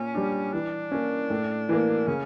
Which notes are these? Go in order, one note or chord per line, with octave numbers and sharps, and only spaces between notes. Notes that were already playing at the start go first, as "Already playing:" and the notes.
Already playing: A#2 C#4
G3 D4
E3 D4
A#3 C#4
A2
E3 A#3
C#3 C#4